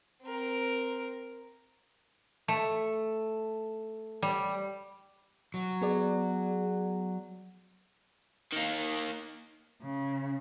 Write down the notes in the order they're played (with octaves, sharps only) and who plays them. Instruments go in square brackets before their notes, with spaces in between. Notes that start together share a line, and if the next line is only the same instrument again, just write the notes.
[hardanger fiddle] C4 A#4
[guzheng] A3
G3
[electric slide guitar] F#3
[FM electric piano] B3 G#4 D5
[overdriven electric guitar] D#3 A#3
[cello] C#3